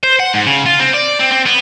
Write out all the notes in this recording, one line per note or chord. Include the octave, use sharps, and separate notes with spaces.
C5
F#5
G#2
C#3
F4
C4
D5
C4
C4
B3